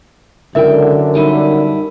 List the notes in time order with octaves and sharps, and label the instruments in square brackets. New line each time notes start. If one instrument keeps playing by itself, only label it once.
[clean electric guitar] C#2 E4 G5 [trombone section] F#2 D3 [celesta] A#4 E5
[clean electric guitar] G3 D#4 E4